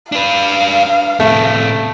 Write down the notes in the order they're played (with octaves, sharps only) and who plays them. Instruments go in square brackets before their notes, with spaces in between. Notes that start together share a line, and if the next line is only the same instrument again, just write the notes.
[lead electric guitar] D4 B4 [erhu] F5
[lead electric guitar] A2 C3 [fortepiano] A3